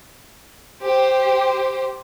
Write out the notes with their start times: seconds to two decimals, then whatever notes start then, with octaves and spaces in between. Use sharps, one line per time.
0.82 G4 C5